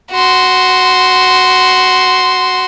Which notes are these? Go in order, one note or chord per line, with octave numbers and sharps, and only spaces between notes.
F#4 C6